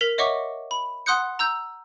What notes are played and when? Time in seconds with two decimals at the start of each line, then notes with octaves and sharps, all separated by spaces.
0.01 A#4 B6 F7
0.18 C#5 D#5 E5 F#5 C#6 D6
0.71 B5
1.06 F#5 C6 D#6 F#6 G6 C#7
1.39 A#5 E6 G6